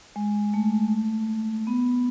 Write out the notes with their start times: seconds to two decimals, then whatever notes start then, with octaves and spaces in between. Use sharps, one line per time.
0.16 G#3
0.54 A3
1.67 B3